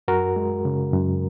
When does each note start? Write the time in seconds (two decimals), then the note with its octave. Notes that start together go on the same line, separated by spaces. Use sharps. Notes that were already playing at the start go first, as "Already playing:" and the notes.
0.08 F#2 F#4 A#4
0.36 G#3
0.65 C#3
0.93 F#2